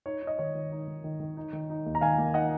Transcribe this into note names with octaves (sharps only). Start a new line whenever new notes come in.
D#4 C#5
D#4 D#5
D#3 C#5
D#3
D#4
D#3
D#3
D#3
D#4
D#3
D#4
D#2
A#5
D#3 F5 G#5
A#3
D#4 D#5 F#5